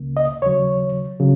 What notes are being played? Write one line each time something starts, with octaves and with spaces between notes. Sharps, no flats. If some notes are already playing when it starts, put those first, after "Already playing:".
Already playing: C#2 C#3 A#3
D#5
D#2 C#3 F#3 C#5
C#3 F#3